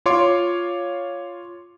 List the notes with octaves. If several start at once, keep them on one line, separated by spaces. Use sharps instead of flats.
F4 C#5 C6 D6